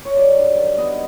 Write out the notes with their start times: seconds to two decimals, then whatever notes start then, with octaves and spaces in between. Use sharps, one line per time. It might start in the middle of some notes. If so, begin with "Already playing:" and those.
0.05 C#5
0.16 F#3 D5
0.37 G2
0.57 D#3
0.78 B3 D#5